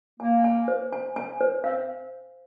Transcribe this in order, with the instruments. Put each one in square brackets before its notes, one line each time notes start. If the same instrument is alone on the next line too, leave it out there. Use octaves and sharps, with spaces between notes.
[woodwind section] A#3 [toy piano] G#5
[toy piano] G#5
C5
G#5
G#5
C5
[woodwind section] C4 [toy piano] F5